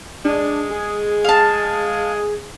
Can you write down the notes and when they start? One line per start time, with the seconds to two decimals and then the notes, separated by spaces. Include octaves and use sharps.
0.25 G#3 D4
0.70 G#4
1.24 F5 A5